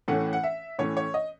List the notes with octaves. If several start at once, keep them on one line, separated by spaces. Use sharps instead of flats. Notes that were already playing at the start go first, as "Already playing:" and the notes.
A2 E3 A3 C#4 F#5
F#5
E5
A2 E3 A3 C#4 C#5
C#5
D#5